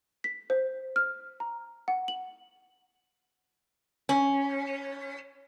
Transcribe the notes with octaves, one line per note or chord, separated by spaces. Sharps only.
B6
C5
F6
A#5
F#5
F#7
C#4